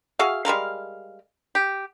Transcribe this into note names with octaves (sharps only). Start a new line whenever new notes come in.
F#4 G#4 E5 F5
G3 G#3 A#4 F5
G4